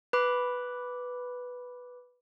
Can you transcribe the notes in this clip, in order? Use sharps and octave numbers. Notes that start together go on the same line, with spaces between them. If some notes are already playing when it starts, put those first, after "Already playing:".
B4 B5 D6